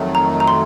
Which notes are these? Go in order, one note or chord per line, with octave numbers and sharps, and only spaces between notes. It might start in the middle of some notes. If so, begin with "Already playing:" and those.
Already playing: F2 D#3 F#3 A3
A#5
A#5
C6